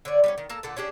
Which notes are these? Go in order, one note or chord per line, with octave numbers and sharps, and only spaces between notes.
D3 C#5 D5
G3 B3 C#4
D#3
A#3 A4 A5 A#5
A#2 D3 A4 F#5
C#4 D4 G4 G#4